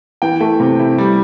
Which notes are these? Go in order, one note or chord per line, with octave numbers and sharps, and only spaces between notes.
E3 G5
A3
C3
E4
G3